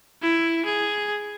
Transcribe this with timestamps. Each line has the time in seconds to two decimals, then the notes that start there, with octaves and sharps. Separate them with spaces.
0.22 E4
0.65 G#4